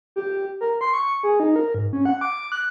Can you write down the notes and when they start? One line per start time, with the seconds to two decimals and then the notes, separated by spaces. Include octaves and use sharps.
0.16 G4
0.61 A#4
0.81 C6
0.93 C#6
1.23 G#4
1.40 D#4
1.56 A#4
1.75 G#2
1.93 C#4
2.06 F#5
2.21 D6
2.52 F#6